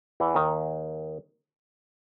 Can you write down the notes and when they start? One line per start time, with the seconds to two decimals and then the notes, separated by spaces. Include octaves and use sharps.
0.20 E2 E3
0.35 D#2 D#3